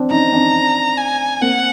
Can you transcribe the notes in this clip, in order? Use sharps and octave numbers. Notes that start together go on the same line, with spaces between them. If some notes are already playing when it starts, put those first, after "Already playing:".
Already playing: C4 D4
C#4 D#4 A#5
C4 D4
G#5
A#3 C4 F#5